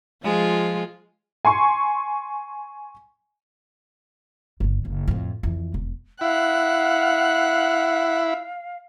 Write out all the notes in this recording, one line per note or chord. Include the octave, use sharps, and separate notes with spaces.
F3 G#3 F4
G#5 C6 C#6
G1 D3
F#1
F2 A2
F2 E3
E1
E4 F5 F#5 F#6